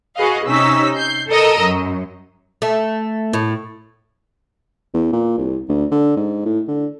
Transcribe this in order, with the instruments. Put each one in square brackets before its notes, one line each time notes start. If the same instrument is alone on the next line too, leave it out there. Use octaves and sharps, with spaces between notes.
[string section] F#4 G#4 B4 D#5 F5
C3 C#4 D#4 E6 B6
G6 C7
A4 A#4 D#5 A#5 E6
F#2
[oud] A3
A2
[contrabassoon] E2
A#2
C2
D2
D3
G#2
A2
D3